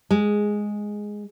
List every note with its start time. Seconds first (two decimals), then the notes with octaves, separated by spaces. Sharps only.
0.11 G#3